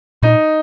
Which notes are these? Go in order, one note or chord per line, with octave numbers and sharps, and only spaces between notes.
A#2 D#4